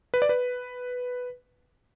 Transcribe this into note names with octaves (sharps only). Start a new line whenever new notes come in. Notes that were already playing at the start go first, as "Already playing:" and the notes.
B4
D5
B4